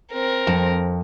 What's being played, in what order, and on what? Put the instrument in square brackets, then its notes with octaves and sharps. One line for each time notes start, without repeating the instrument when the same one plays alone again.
[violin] C4 A#4
[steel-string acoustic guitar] F2